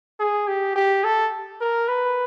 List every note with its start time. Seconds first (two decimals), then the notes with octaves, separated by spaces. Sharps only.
0.20 G#4
0.47 G4
0.75 G4
1.04 A4
1.61 A#4
1.88 B4